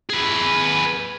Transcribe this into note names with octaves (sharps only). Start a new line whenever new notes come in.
G#4 B4